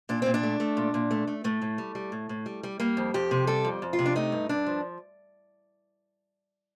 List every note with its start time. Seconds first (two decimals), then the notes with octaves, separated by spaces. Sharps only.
0.09 A#2 D4
0.22 A#2 C4
0.34 D4
0.43 A3
0.60 A3
0.77 A#2
0.94 A#2
1.11 A3
1.27 A3
1.44 A2 A3
1.62 A2
1.78 G3
1.95 G3
2.12 A2
2.29 A2
2.46 G3
2.63 G3
2.80 G3 A#3
2.97 F2
3.14 F2 G4
3.31 C3
3.47 G3 A4
3.65 F2
3.82 F2
3.93 F4
3.99 C3
4.06 D4
4.15 A3 D#4
4.32 G2
4.49 G2 D4
4.66 F3